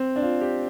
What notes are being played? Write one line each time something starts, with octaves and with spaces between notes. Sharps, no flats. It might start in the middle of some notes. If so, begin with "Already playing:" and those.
Already playing: C4
D4
F4
G4